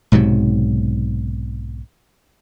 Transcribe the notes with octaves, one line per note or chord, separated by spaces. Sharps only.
B1 G#2 C3 F#3